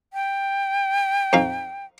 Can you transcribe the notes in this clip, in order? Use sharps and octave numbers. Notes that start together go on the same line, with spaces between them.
G5
F2 D#4 F5